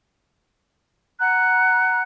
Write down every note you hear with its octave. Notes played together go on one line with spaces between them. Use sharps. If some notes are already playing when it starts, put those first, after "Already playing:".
F#5 A#5 F#6